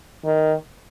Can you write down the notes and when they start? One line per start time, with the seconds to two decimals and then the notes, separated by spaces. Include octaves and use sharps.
0.25 D#3